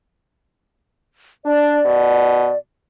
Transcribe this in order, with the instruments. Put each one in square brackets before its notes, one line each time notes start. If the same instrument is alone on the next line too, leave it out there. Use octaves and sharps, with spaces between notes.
[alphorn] D4 [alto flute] D5
[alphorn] B2